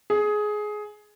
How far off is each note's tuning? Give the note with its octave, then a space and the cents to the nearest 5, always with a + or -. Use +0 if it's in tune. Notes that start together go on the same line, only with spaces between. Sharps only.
G#4 +15